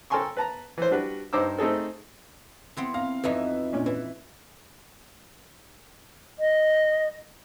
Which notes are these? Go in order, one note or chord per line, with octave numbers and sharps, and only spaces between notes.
A4 A#4 G5 G#5 C6 C#6
B4 A5 A#5
E3 C5
G3 D4 F#4 B4
G2 D#4 C5 D6 E6
A3 C4 D#4 G#4 A4
E3 B3 C4
F5 A#5
F2 E3 D#4 B4 E5
A#2 C#4 D4
E3 B4
D#5